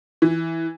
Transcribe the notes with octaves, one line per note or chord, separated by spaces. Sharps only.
E3